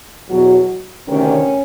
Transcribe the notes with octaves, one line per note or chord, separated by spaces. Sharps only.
E2 B2 F#3
D2 C3 D#3 C#4